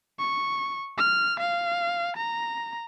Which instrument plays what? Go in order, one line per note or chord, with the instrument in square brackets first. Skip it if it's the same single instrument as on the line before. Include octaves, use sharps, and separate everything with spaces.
[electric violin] C#6
F6
F5
A#5